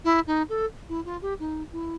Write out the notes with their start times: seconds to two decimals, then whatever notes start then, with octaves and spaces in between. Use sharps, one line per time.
0.04 E4
0.26 D#4
0.49 A4
0.88 E4
1.05 F4
1.21 G4
1.39 D#4
1.72 E4